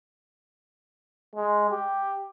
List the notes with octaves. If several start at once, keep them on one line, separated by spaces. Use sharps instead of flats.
G#3
G4